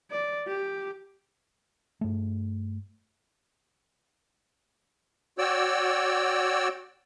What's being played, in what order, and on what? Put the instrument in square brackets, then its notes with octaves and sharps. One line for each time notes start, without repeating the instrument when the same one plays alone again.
[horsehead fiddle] D5
G4
[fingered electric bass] G2 A3
[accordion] F#4 C#5 D5 G5 E6